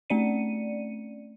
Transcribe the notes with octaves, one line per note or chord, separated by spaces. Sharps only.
A3 C4 C#4 D5 C#7 D#7